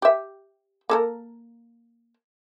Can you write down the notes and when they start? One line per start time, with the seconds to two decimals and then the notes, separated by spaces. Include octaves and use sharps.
0.02 G4 E5
0.89 A#3 A4 A#4